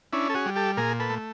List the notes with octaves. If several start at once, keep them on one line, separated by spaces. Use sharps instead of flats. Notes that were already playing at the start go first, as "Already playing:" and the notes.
C#4 D4 E4
A4
F#4 G#4
G3
G4 A4
A#2 G#4 A#4
A4 B4
A3